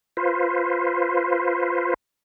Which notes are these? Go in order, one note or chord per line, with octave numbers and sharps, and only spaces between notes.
F4 B4 C5